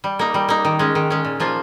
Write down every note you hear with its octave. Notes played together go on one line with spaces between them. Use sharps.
G3
A#3 D#4
G3
A#3 D#4
D#3
G#3 C#4
D#3
G#3 C#4
A#2
F3 A#3 F4